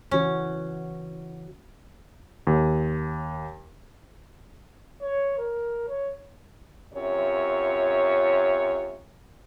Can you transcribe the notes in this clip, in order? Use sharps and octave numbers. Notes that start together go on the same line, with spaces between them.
C#3 E3 C#4 F#4
D#2
C#5
A#4
C#5
F#2 C3 F4 C#5